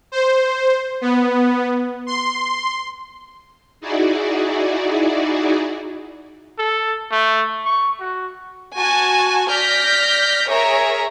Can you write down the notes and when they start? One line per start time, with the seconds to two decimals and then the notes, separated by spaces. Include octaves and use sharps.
0.12 C5
1.01 B3
2.07 C6
3.81 D#4 E4 F#4 G#4 D5
6.58 A4
7.12 A3
7.65 C#6
8.00 F#4
8.76 F#4 G#5 A5
9.50 D5 F6 G6 A#6 B6
10.49 G#4 A#4 C#5 E5 A#5